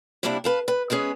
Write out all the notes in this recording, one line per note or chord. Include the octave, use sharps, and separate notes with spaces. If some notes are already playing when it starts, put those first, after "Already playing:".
C3 G3 A#3 D4 E4 G4
B4 F5 A5
B4
G#3 B3 C#4 G#4